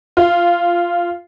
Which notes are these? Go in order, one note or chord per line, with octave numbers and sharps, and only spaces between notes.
F4